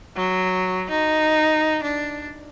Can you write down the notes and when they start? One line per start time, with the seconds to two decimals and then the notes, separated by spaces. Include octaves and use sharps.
0.16 F#3
0.90 D#4
1.83 D4